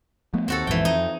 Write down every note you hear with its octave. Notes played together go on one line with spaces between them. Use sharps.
F3 A3 B3
D#2 C4 F#4 A4
A#1 F2 G#2 E3 G5
F2 D#4